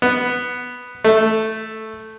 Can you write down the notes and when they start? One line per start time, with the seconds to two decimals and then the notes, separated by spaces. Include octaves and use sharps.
0.02 B3
1.04 A3